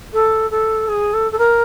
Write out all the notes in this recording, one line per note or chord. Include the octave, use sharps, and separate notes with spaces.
A4
A4
G#4
A4
A4
A#4